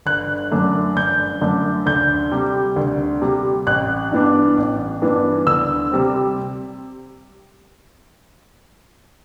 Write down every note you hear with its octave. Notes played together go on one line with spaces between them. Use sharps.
G1 F#6
F#2 D3 A3 D4
G1 G6
F#2 D3 A3 D4
D2 G6
C3 G3
D2
C3 G3
A1 F#6
G2 E3 B3 D4
A1
G2 E3 B3 D4
D2 E6
C3 G3 C4